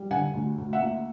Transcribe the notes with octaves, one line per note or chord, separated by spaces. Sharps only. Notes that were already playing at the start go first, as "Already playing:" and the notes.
Already playing: G3
D3 F#5 G#5
D2
D2
E5 F#5
A#3